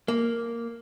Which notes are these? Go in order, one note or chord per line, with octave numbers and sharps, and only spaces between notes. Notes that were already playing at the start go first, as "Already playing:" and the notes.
A#3